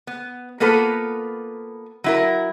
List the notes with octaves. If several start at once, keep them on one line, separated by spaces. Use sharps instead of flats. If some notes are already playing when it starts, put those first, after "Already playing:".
B3
A#3 B3 F4 A4 B4
F#3 E4 A#4